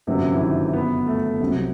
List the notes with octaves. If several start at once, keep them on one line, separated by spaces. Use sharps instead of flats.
G1 F#2 C3 F#3
E3
D#3
B3
A3
C2 C3 F#3 G3
G3